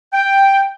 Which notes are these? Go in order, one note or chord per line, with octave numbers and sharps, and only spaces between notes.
G5